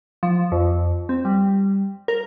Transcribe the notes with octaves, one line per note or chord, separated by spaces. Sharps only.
F3
F2
C4
G3
A#4